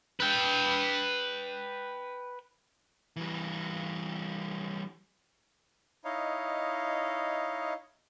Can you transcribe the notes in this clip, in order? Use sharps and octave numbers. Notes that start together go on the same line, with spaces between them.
B4 G5
E3 G3
D#4 E4 C#5 D#5 F5